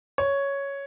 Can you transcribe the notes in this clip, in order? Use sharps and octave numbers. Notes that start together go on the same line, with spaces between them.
C#5